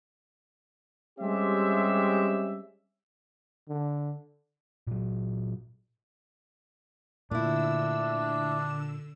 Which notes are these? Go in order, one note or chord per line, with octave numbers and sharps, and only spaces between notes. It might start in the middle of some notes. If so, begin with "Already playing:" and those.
G3 G#3 C4 C#4 G4 E5
D3
A#2 F#3
A#2 D3 A3 D4 E4 E6